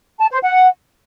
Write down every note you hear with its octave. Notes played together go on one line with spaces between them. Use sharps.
A5
C5
F#5